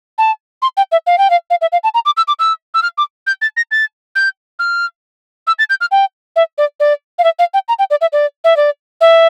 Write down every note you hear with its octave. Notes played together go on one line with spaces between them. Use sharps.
A5
C6
G5
E5
F5
G5
F5
F5
E5
F5
A5
A#5
D6
E6
D6
E6
E6
F6
D6
G6
A6
A#6
A6
G6
F6
E6
A6
G6
F6
G5
E5
D5
D5
F5
E5
F5
G5
A#5
G5
D5
E5
D5
E5
D5
E5